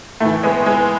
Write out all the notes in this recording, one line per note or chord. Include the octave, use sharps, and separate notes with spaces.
A2 E3 A3
G#3 B3
G#3 B3